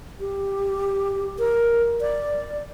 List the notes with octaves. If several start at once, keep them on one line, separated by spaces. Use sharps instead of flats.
G4
A#4
D5